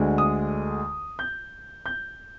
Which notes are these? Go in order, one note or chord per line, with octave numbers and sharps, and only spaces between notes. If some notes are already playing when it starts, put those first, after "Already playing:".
Already playing: D2 D3 G#3
D#6
G6
G6